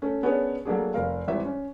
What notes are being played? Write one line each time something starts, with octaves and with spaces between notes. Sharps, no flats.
A3 C#4
B3 C#4 D4 G#4 A#4 C#5
F#3 A3 A#3 D4 G#4
F1 A#4 F5
G#1 E3 G3 E5
C#4